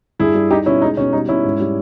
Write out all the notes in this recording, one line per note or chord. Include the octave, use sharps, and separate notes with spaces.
G2 E4 G#4
G3
G3 D#4 G4
B2 C#4 E4
G#3 D#4
B2 C#4
G3 D#4
B2 C#4 E4
G#2
G3